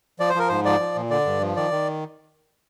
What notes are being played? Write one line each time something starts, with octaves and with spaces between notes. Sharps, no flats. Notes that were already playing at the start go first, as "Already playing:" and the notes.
F3 D5
C5
F3 A#4
G#2 C5
F3 D5
F3
A#2
D3 D5
G2
F3
D#3 D5
D#3